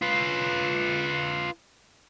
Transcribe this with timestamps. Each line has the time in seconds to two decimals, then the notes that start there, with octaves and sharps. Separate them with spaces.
0.02 F4 B4